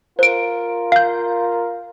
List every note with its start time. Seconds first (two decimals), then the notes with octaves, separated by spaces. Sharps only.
0.19 F4 A#4 C5 D7
0.92 F5 G6